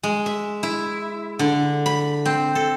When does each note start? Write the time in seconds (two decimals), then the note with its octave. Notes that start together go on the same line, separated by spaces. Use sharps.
0.03 G#3
0.26 E5
0.63 E4
1.39 D3
1.86 B5
2.26 C4
2.55 A4